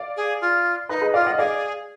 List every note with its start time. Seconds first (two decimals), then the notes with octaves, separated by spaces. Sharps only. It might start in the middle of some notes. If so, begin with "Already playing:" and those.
Already playing: D5 F5
0.17 G#4
0.41 F4
0.89 D#4 B4 D#5
1.01 G#4 B4
1.14 F4 D5 F5
1.27 D#5 F#5
1.38 G#4 D5 F5